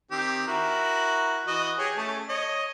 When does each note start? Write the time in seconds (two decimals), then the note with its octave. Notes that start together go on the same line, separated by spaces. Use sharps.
0.11 D#3 C4 G4
0.47 E4 F#4 A#4
1.47 E3 F#4 D#5
1.78 G4 G#4 C#5
1.97 A3 C#4 A5
2.29 C#5 D#5